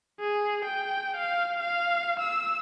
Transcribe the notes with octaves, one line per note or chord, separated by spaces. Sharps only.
G#4
G5
F5
F5
E6